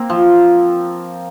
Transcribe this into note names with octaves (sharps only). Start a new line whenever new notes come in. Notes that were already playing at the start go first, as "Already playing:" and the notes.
Already playing: A#3 C4
F3